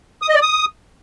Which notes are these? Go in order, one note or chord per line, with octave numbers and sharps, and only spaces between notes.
D#6
D#5
D5
D#6